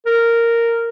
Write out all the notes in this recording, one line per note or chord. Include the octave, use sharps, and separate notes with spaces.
A#4